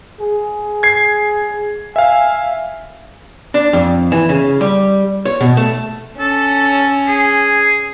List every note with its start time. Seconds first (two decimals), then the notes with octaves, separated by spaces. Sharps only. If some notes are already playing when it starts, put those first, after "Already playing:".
0.20 G#4
0.83 G#6 C7
1.96 E5 F5 G#5
3.54 D4
3.73 F2
4.12 E3
4.29 C#3
4.61 G3
5.26 C#5
5.41 B2
5.57 A3
6.20 C#4 A4
7.08 G#4